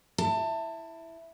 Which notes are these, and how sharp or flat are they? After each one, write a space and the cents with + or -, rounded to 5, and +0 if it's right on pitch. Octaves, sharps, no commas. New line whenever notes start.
E4 +0 A5 +25